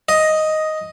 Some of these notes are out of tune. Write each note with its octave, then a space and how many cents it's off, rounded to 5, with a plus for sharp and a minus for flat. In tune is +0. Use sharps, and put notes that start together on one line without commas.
D#5 +5